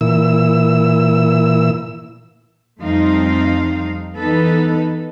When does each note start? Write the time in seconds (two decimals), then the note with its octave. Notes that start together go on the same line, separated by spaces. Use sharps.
0.01 A#2 E3 E6
2.80 F2 G3 A3 C4 D#4 F5
4.18 E3 B3 D#4 A4 B4